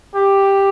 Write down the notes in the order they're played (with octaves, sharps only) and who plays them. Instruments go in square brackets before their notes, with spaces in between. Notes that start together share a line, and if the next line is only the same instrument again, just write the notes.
[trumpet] G4